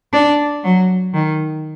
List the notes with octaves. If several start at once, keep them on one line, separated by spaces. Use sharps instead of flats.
D4
F#3
D#3